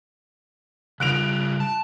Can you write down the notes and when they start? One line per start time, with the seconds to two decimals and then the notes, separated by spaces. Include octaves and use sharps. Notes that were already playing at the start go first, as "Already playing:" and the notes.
1.00 C#3 G3 F4 F#6 D7 F7
1.60 A5